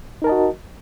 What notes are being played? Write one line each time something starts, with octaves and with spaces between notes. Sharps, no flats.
D#4 F#4 A#4 D#5 A5